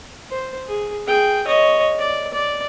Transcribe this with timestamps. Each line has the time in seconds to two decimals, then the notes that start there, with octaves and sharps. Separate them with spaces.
0.31 C5
0.68 G#4
1.07 G#4 G5
1.47 C#5 D#5
1.99 D5
2.33 D5